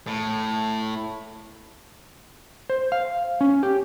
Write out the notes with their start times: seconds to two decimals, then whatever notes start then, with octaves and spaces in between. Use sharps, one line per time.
0.07 A2
2.70 C5
2.92 F5
3.41 C#4
3.63 G4